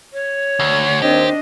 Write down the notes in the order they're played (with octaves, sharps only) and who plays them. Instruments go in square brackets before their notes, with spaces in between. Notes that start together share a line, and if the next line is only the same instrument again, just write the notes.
[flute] C#5
[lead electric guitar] D2
[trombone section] D#2 C4 [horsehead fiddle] D4 D#5 [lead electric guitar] G4